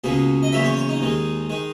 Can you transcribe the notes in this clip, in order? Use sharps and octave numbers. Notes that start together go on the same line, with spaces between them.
C#2 B2 A#3 G#4
D#5
E2 C#3 F#3 A#3 E5
C#5
C#5
D#4
D#2 D#3 G#3
D#3 G#3